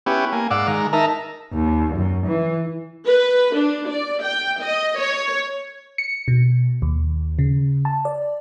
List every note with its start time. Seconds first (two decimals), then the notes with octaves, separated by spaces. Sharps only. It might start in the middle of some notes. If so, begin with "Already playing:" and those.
0.06 B3 C#4 E4 G4 G#5
0.32 A#3 G#5
0.51 G#2 D5 F5 F#5 D6 E6
0.68 D#3 G#3 A#5
0.93 D#4 A#4 E5 A5 A#5
1.53 D#2
1.95 F#2
2.26 E3
3.07 B4
3.56 D4
3.90 D5
4.23 G5
4.62 D#5
4.99 C#5
5.98 C#7
6.28 B2
6.82 D#2
7.39 C#3
7.85 A5
8.05 D5